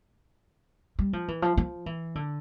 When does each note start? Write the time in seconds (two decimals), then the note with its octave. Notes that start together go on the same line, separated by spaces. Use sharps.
0.99 G3
1.13 F3
1.28 E3
1.42 F3
1.57 F3
1.86 E3
2.15 D3